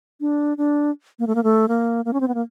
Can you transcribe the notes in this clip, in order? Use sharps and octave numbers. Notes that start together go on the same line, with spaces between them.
D4
D4
A#3
A3
A#3
A3
A#3
A#3
C#4
C4
B3
A#3